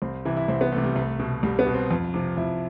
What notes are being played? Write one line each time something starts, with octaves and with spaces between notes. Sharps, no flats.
C2 C4
C3 E3 E4
E4
C2 C4
B3
C3 E3 A3
G3
C2 A3
B2
C2 G3
B3
B2
C4
F2
C3 F3
F2 E4